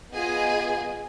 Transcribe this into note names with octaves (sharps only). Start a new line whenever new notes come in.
B3 F4 G#4 D#5 G#5